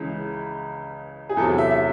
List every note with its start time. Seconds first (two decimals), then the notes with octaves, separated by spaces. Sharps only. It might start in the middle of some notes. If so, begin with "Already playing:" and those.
Already playing: C#2 C#3 E3 G#3
1.29 G#4
1.37 E2 C3 F#3 A4
1.58 E5
1.71 E5